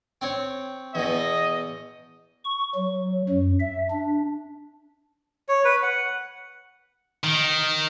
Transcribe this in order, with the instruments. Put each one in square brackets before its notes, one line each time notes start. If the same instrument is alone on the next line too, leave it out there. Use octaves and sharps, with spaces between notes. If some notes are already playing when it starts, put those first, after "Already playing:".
[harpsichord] C4 C#5
[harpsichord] E2 B2 [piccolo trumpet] D#5
[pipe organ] C#6
F#3
F#2
E5
D4
[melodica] C#5
B4
F#5
[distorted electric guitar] D#3